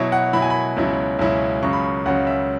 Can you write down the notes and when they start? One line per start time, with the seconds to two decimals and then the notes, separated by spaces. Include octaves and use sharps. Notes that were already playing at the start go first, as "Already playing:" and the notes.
Already playing: B2 F#3 E4 C#5
0.12 F#5
0.33 B2 F#3 E4 B5
0.42 G#5
0.50 B5
0.76 C#2 B2 F#3 C#4 E4
1.19 C#2 B2 F#3 C#4 E4
1.62 C#2 C#3 F#3 C#6
1.73 B5
1.84 C#6
2.06 C#2 C#3 F#3 F#5
2.27 E5